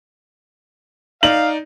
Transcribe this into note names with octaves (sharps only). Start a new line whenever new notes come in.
D#4 D5 F5 F#7